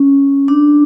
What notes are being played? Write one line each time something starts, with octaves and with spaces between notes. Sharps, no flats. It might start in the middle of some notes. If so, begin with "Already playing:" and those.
Already playing: C#4
D4